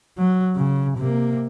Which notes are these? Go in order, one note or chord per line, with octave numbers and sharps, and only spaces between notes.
F#3
C#3
C3 A#3